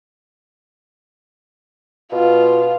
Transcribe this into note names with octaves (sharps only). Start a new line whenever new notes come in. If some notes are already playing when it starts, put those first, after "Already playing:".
B2 F4